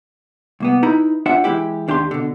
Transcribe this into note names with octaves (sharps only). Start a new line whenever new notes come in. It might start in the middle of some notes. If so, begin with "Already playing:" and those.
C2 A#3 B3
D#4 E4 B4 A#5 B5
D4 F4 C5 E5 F#5
E3 F3 G#3 E4 G4
D#2 D4 G4 F5 C6
B2 D3